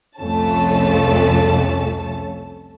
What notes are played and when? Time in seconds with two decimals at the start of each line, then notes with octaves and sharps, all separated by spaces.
0.18 C2 F2 A3 C#4 A5